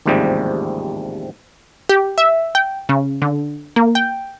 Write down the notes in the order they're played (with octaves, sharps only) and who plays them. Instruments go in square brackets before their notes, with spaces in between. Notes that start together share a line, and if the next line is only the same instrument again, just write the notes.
[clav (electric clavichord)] A1 D#2 G#2 C3 F3 G3
[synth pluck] G4
E5
G5
C#3
D3
A#3
G5